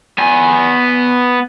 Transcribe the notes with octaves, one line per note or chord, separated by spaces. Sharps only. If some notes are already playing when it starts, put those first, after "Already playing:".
B3 G#5